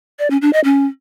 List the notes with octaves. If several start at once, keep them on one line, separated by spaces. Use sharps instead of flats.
D5
C#4
D4
D#5
C#4